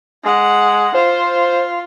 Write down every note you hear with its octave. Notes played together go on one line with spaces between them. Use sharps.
G#3 F#5
F4 C5